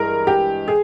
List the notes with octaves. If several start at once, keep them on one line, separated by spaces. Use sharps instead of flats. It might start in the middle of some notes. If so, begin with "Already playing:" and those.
Already playing: G2 E3 G#3 A#4
G4
G#4